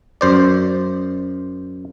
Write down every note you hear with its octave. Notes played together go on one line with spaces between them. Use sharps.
F#2 C5 D5